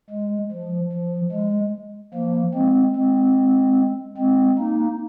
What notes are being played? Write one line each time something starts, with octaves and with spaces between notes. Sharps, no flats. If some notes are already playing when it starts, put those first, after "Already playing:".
G#3
F3
F3
G#3
F3 A#3
G#3 C4
G#3 C4
G#3 C4
A#3 D#4